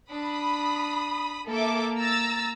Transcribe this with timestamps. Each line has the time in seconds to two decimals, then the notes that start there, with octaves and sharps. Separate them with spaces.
0.11 D4 B5 D#6
1.48 A#3 A4 E5 D6
1.99 A#5 E6 A6